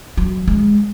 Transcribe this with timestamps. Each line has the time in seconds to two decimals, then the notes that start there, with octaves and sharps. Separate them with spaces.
0.17 F#3
0.48 G#3